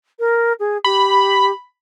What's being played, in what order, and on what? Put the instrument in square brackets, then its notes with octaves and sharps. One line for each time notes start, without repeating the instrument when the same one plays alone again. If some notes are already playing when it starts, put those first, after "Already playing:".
[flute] A#4
G#4
[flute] G4 [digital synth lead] B5